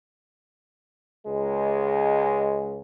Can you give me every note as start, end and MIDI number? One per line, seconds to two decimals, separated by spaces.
1.27 2.80 37
1.27 2.80 56